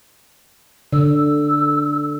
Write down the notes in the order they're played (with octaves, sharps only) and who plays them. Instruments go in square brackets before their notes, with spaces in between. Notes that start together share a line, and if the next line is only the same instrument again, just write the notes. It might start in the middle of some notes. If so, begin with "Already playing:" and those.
[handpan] D3 [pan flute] E6